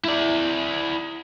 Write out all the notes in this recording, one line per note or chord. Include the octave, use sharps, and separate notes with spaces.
E4 D5